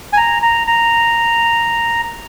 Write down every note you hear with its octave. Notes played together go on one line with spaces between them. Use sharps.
G#5
A#5
A#5
A#5